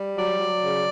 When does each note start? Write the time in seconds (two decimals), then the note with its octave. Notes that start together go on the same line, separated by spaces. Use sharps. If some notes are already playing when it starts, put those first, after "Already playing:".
Already playing: G3
0.16 F#3 D5
0.39 F#3
0.62 C#3